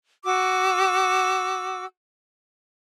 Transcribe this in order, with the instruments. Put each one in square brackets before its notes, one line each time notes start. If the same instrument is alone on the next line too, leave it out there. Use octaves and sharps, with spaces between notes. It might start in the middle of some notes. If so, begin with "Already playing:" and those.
[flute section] F#4 D6 E6